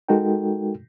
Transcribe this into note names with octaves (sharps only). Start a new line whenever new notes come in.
G#3 D#4 F#4 A4 A#4 G5